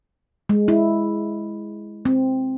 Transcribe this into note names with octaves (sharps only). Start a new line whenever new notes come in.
G#3
E4
C4